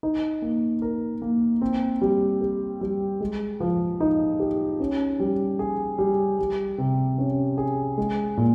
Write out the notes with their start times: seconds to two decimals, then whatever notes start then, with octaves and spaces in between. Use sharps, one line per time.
0.03 D#4
0.42 A#3
0.82 A#4
1.22 A#3
1.61 C4
2.01 G3
2.41 G4
2.81 G3
3.20 G#3
3.60 F3
4.00 D#4
4.40 G4
4.80 C#4
5.20 G3
5.59 G#4
5.98 G3
6.39 G3
6.78 C3
7.18 C#4
7.58 G#4
7.98 G#3
8.37 A#2